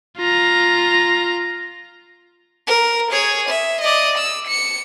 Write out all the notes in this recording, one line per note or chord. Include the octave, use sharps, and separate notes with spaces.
F4 A#5
A#4
G#4 C#5
E5
D5 D#5
E6
C#7